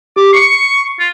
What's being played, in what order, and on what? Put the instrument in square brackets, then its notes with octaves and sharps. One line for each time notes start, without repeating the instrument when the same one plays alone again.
[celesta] G4 [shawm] D6
[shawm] C#6 [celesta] C7 C#7
[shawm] F4